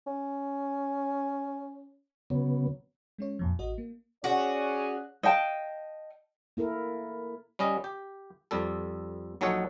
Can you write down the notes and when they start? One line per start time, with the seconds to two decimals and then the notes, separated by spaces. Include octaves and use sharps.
0.07 C#4
2.30 C#3 F#3 B3
3.18 G#3 C#4 C#5
3.39 F2 A#2 F3
3.59 A1 F#4 D#5
3.78 A#3
4.24 C#4 F#4 G#4 D5
5.23 D#5 F5 G5 A5
6.57 A#3 E4 A4 A#4
7.59 G3 C#4 D#5
7.84 G4
8.51 F2 G3 A4
9.41 A#1 F#3 D#4 A4 C#5 F#5